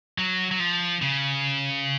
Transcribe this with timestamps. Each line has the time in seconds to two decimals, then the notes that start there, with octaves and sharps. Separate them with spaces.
0.18 F#3
0.51 F#3
0.60 F3
1.02 C#3